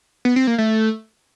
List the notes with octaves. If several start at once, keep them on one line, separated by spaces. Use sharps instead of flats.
B3
C4
A#3
A3